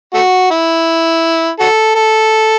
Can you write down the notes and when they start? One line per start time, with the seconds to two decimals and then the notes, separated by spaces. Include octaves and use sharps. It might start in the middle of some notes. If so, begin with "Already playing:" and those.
0.14 A3 F#4
0.51 E4
1.60 F#4 A4
1.95 A4